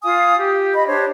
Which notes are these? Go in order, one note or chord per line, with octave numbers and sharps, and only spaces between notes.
F4 F5 G#5 D#6
G4
D#5 B5
D4 G4 C5 C#5